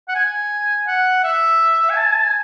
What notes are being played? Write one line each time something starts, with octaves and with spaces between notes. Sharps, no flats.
F#5
G#5
F#5
E5
G#5
A5
G#5
A5
G#5